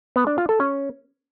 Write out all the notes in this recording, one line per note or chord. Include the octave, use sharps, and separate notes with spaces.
B3
D4
F4
A4
C#4